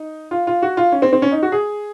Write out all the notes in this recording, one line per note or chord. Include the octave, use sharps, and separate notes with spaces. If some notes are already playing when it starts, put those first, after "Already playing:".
Already playing: D#4
F4
F4
F#4
F4
C#4
C4
C4
C#4
D#4
F#4
G#4